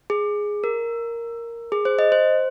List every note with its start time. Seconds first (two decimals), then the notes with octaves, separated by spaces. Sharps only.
0.10 G#4
0.64 A#4
1.72 G#4
1.85 C5
1.99 D#5
2.12 C5